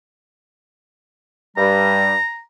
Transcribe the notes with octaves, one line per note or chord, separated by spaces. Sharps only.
G2 G3 A#5